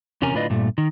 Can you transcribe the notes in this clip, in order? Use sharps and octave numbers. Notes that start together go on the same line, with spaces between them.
E2 C3 C#4 A#4 G#5
A2 D3 F4 B4 D5 D#5
G2 A#2 A3
D#3